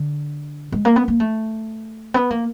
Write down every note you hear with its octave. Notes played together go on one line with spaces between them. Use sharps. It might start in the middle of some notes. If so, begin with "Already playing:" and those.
Already playing: D3
G#3
A#3
B3
A#3
A3
B3
A#3